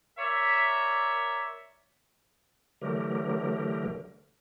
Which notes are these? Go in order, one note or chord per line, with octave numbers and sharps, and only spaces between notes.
A#4 C#5 D5 E5
D3 E3 F#3 A3 G4 A#4